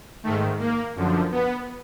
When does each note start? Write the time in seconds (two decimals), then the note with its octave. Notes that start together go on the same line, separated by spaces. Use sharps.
0.23 G#2 D#3 A3
0.59 A#3
0.96 F#2 D3 F3
1.31 B3